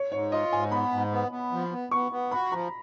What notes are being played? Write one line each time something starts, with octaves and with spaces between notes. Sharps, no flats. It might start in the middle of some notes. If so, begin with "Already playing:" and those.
Already playing: C#5
G#2 C#5
F4 D#5
G#2 G#5
B3 B5
G#2
B3
B3
F3
B3
B3 C#6
B3
F#4 B5
F3 A#5